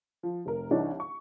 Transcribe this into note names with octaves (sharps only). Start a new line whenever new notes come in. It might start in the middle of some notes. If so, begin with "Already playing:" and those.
F3
F1 A#4
C2 E3 D4 D#4 C#5
C#6